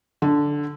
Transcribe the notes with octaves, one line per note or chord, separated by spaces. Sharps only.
D3